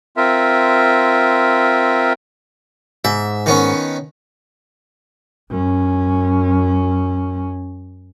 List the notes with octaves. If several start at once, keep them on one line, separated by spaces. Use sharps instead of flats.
C4 F4 A#4 E5
G#2 E5
D#3 B3 C#4
F#2 C#4